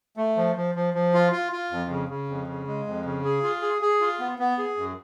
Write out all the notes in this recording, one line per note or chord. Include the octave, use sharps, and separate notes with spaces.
A3
F3
F3
F3
F3
F4
F4
F4
F2
C#3
C#3
F2
C#3
G#3
F2
C#3
G#4
F4
G#4
G#4
F4
B3
B3
G#4
F#2